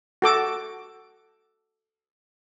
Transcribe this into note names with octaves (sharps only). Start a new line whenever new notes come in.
F#4 A4 D6